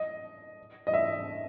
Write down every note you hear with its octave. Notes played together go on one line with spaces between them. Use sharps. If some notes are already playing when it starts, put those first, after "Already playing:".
Already playing: D#5
D#5
E5